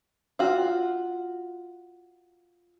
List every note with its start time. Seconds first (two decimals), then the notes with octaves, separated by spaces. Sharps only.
0.39 F4 F#4